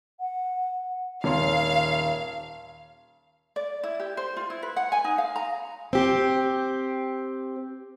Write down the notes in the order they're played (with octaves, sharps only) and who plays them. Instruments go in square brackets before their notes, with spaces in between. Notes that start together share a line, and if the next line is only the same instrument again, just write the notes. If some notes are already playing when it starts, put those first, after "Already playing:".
[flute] F#5
[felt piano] D#1 C#5 C6 [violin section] F5
[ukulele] D5
E4
G4
C5
F4
E4
B4
F#5
G#5
D#4
F5
A#5
[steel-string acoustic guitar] C4 G4